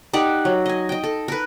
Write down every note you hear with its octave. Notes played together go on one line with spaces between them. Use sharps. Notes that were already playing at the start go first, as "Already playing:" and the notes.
D#4 G4 D5 F#5
F#3
D#5 G#5
D#5 G5
A4
A#4 B4